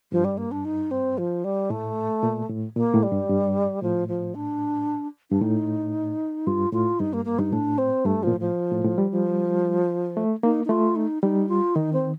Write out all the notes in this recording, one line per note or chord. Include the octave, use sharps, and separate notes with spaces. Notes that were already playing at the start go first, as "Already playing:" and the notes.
G2 F3
G3
A#3
D4
D#4
C4
F3
G3
A2 A3
A#2
A2
A#2 A#3
A2
G3
G2
G2
A2 F3
F3
D4
G2 D4
A2 D#4
G2 F4
A2 F4
G2 D#4
A#3
A#3
G2 D#4
A2 D4
C4
G2 A3
A#2 F3
A2
F3
A2
A2
G3
F3
A3
A#3 D#4
D#4
A3 F4
D#4
G3 D#4
F4
D#3 D#4
C4